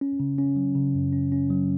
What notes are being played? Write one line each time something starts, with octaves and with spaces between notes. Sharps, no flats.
C#4
C#3
C#4
F#3
C#3
F#2
C#4
C#4
F#3